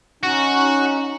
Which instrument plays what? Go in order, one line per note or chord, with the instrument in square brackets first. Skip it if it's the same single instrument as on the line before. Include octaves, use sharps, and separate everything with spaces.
[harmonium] C#4 D#4 [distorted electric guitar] F#4